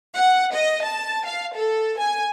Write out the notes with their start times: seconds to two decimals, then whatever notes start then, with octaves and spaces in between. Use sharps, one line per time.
0.16 F#5
0.52 D#5
0.84 A5
1.25 F5
1.55 A4
1.99 G#5